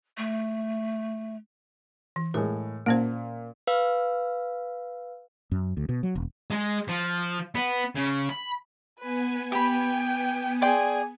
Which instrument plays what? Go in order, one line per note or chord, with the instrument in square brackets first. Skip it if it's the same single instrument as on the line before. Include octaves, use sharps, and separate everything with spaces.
[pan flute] A3
[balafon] E3
[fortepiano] A2 G#3 [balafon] A#4
[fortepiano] A#2 [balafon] A#3 C#4 C5
[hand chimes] B4 F5 E6
[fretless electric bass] F#2
D2
B2
F#3
E1
[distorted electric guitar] G#3
F3
B3
C#3
B5
[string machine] B3 G#5 [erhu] B4
[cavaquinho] G4 B5 [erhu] G5
[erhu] G#4 [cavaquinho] D5 G5 C6